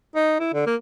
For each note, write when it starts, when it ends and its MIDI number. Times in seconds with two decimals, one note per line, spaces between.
0.15 0.37 63
0.39 0.49 64
0.54 0.65 50
0.66 0.75 58